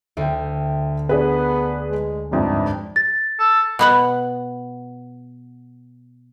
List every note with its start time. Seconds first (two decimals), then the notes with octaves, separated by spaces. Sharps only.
0.17 D2 E5 G5
1.09 B3 D4 G#4 B4
1.90 G#3
2.32 G1 F2 G#2 D4
2.96 A6
3.39 A4
3.79 B2 B3 F#5